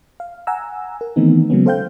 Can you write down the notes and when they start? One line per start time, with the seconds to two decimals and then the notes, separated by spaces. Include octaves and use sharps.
0.20 F5
0.47 F#5 G#5 A#5 E6
1.01 A#4
1.16 D#3 E3 A3 B3 C4 D#4
1.50 C#3 F#3 G#3 A#3 B3 C#4
1.66 A4 C5 F5 G5 G6